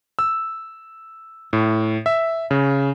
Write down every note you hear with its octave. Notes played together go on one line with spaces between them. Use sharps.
E6
A2
E5
C#3